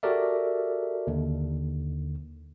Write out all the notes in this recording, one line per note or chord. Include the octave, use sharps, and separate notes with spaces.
F#4 G4 A4 A#4 D5 E5
D#2 D3